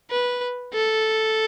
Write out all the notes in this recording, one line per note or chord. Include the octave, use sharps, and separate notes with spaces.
B4
A4